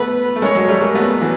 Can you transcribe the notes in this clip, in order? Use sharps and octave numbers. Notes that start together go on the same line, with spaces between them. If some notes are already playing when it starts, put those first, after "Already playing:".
Already playing: A3 B3 B4
A3
G#3 A#3 C#5
F#3 G#3
G3 A3
G#3 A#3
A3 B3 B4
E3 F#3